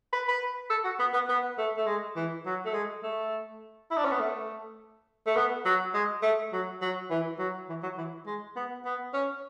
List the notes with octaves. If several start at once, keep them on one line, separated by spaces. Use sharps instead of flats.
B4
B4
A4
F#4
B3
B3
B3
A3
A3
G#3
E3
F#3
A3
G#3
A3
E4
D4
C#4
B3
A3
A3
B3
F#3
G#3
A3
F#3
F#3
E3
F#3
E3
F#3
E3
G#3
B3
B3
C#4